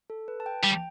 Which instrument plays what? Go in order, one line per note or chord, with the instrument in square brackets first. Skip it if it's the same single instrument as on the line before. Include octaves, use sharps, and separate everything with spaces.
[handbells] A4
B4
A5
G5
[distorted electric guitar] G3 [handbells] G5